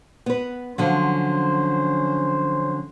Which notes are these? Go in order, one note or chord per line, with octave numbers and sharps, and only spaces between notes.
B3 B4
D3 F3 F#3 C#4 C5